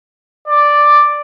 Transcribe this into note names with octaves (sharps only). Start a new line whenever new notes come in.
D5